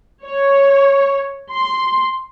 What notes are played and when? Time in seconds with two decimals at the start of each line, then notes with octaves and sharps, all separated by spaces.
0.24 C#5
1.51 C6